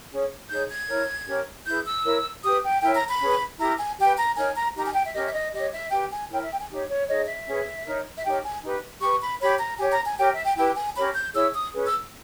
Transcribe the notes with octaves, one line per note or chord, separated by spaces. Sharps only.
C#4 G#4 C#5
D#4 G#4 C#5 G6
G#6
E4 A#4 C#5
C#4 G4 A#4 C#5
E4 G#4 B4 G6
E6
E4 A#4 C#5
G4 B4 D#6
G5
E4 A#4 C#5 G5
A#5
B5
C#4 G#4 B4
E4 G4 A#4 A#5
G#5
G4 B4 G5
A#5
D#4 A#4 C#5 G#5
A#5
D#4 G4 A#4 A#5
G#5
G5
E5
C#4 G4 A#4 D#5
E5
D#5
G4 C#5 D#5
E5
G4 B4 G5
G#5
E4 A#4 C#5 G5
E5
G5
G#5
D#4 G4 C#5
C#5
D#4 G#4 C#5 D#5
E5
C#4 G#4 B4
D#4 A#4 C#5
E5
D#4 G4 A#4 C#5 G5
G#5
D#4 G4 B4
G4 B4 C#6
B5
G4 C#5 B5
A#5
G4 C#5 G#5
A#5
G#5
G4 A#4 C#5 G5
E5
G5
E4 G4 B4 G5
G#5
C#4 G4 A#4 C#5 B5
G6
E4 G#4 C#5 E6
D#6
C#4 G#4 B4
E6